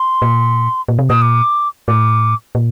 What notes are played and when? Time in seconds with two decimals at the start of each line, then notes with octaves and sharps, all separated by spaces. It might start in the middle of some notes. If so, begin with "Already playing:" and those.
Already playing: C6
0.22 A#2
0.88 A#2
0.99 C3
1.10 A#2 D#6
1.22 D6
1.88 A2 D6
2.55 A#2